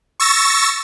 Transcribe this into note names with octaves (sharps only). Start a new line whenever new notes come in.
C#6 E6 A6 A#6